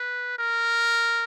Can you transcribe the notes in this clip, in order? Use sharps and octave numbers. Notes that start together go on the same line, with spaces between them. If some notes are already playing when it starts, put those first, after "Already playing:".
Already playing: B4
A#4